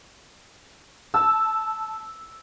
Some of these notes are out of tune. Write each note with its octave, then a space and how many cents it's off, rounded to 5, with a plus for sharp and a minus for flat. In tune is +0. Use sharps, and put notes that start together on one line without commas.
A5 -15 E6 +0